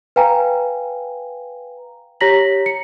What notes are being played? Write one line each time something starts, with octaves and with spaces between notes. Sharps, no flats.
B4 F5 G5 G#5 A#5
G4 C#5 A#5 A#6 B6 F#7
C#7